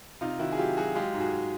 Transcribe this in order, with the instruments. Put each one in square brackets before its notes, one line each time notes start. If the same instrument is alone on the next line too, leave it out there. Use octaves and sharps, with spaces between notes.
[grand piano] C3 D#4 F4
D#3 E4 F#4
G#4
F#3 F4 G4
F#3 F#4 G#4
G#3 F4 G4
G#2
F#4 G#4